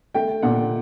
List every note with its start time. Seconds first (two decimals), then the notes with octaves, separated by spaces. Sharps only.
0.14 A3 G5
0.43 A#2 F#5